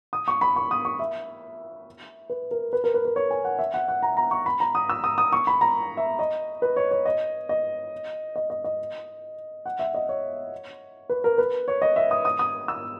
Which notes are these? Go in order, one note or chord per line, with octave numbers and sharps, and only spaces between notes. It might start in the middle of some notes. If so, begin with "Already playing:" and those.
D#6
C#6
B5
C#6
D#6
C#6
E5
B4
A#4
B4
A#4
B4
B4
C#5
G#5
F#5
E5
F#5
F#5
A#5
A#5
C#6
B5
A#5
D#6
E6
D#6
D#6
C#6
B5
A#5
E5
D#5
B4
C#5
C#5
D#5
D#5
D#5
D#5
D#5
F#5
E5
D#5
C#5
B4
A#4
B4
C#5
D#5
E5
D#6
D#6
D#6
E6